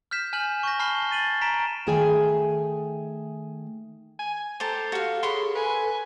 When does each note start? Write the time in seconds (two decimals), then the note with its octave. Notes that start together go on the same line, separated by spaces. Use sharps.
0.11 F6 G6 B6 E7
0.33 G#5 F6 G6 F#7
0.63 C#6 G6 A#6
0.79 A5 B5 F6 C7 G7
1.11 A6 D#7 F#7
1.41 A#5 B6 D7 E7
1.87 D#3 A3 G#4 G5 G#5
4.19 G#5
4.60 G4 A4 C5 A5 A#5
4.92 F#4 G4 F5
5.23 G#4 A#4 C#5 B5 C6
5.55 A4 B4 G#5